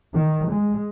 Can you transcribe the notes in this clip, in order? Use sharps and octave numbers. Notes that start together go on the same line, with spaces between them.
D#3
G#3